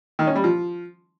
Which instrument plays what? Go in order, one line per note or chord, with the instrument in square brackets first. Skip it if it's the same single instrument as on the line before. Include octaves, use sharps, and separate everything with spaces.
[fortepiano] D#3
C#4
G3
F3